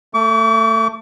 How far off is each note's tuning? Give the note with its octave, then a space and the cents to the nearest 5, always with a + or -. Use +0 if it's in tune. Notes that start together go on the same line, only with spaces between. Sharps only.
A3 +20 D6 -45